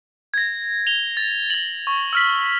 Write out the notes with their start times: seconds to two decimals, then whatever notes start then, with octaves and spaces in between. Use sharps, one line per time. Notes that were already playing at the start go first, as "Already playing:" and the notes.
0.34 G#6 A#6
0.87 F7 G7
1.17 A6
1.50 A6 F#7
1.87 C#6
2.13 E6 F6 B6